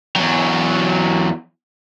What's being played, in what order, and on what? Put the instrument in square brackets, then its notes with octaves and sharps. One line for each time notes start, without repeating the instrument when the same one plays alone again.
[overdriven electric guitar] E2 F#3